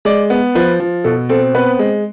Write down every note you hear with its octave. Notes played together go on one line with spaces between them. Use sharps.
G#3 D5
B3
F3 B4
F3
B2 A4
C4 A4
B3 B4
G#3